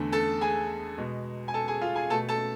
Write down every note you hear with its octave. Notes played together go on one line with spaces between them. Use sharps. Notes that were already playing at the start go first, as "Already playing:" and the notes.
Already playing: E2 D3 A3
A4 A5
G#4 G#5
B2 G#3
G#5
A4 A5
G#4 G#5
F4 F5
G#4 G#5
B2 A3 A4 A5
A4 A5